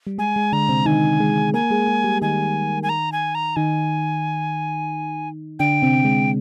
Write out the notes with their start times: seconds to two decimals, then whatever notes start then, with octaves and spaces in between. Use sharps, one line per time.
0.07 G3
0.18 G#3 G#5
0.36 G#3
0.52 D3 D4 A#5
0.69 C3 C4
0.86 D#3 D#4 G#5
1.20 G#3 G#4
1.54 A#3 A#4 G#5
1.70 G#3 G#4
1.88 G#3 G#4
2.04 G3 G4
2.22 D#3 D#4 G#5
2.83 G#5
2.89 A#5
3.12 G#5
3.35 A#5
3.56 D#3 D#4 G#5
5.59 D3 D4 G5
5.82 C3 C4
6.04 G#3